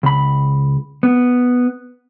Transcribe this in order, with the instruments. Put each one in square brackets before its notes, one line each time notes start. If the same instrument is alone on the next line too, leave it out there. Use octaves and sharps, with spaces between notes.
[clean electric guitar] C#2 B5
B3